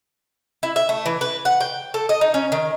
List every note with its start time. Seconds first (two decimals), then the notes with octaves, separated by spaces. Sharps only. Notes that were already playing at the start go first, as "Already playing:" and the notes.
0.63 E4
0.76 E5
0.89 A3
1.06 E3
1.21 B4
1.45 F#5
1.61 G5
1.94 A4
2.09 D#5
2.21 D#4
2.34 C#4
2.52 D#3